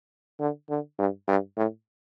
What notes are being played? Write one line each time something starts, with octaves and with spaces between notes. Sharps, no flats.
D3
D3
G2
G2
A2